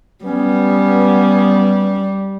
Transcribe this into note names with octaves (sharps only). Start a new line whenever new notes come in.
G3 B3 C#4